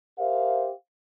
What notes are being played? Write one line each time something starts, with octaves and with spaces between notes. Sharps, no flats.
G4 A#4 C5 E5 F5